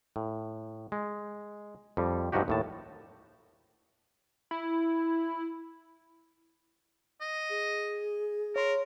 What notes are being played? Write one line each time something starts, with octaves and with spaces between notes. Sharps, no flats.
A2
G#3
F2 G3
G2 F3 D#4 F#4 G4
D#2 A2 A5
E4
D#5
G#4
A#4 C#5 C6